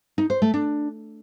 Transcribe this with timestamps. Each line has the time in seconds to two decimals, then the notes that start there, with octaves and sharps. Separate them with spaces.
0.18 D#4
0.30 C5
0.42 A3
0.54 D4